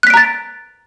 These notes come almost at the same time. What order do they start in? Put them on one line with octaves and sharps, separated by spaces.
F#6 B6 D7 A#5 A6